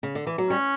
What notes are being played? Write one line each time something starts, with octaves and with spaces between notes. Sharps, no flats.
C#3
D3
E3
F#3
G3 C#4